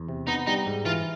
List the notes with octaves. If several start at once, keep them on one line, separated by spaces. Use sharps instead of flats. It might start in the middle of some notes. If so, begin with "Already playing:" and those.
Already playing: E2
C3
B3 D#4
G3 D#4
G#2
E3 F4